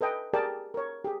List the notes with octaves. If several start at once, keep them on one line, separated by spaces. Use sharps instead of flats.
A4 B4 D#5 G5 G#5
G4 G#4 A#4 D5 G5 A5
A#4 C#5
G4 G#4